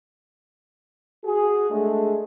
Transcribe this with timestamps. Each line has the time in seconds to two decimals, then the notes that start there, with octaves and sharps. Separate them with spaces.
1.24 F#4 G#4
1.71 G#3 A3 D4 G#4 A4